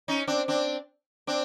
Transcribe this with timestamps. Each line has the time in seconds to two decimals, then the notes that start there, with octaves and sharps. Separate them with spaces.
0.08 C#4 D#4
0.27 C4 D4
0.48 C4 D4
1.27 C4 D4